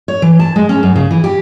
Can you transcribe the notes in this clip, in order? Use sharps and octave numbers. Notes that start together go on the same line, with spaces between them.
C#5
E3
A5
G#3
C#4
F#2
C#3
E3
G4